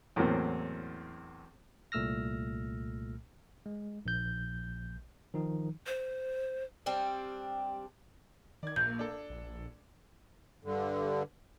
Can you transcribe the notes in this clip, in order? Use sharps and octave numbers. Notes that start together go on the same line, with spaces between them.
E2 A2 F#3 A#3 C4
C2 A#2 A3 E6 F6 A#6
G#3
A#1 G6
D#3 F3 D#4
C5
G3 C4 D4
D#3 D5 G#6
A#1 A#3 G6
D4 A4
A#1
G2 D3